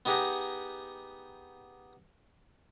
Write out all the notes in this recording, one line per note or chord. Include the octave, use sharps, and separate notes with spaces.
B3 D#4 G4 G#4 F#5 A#5